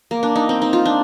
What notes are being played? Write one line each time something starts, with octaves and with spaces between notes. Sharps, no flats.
A#3
D4
D#4
C4
D#4
F4
D4